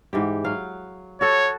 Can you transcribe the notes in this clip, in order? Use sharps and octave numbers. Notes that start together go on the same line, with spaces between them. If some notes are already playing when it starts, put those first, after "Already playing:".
G#2 E3 G4
F#3 F5
F#4 A4 C#5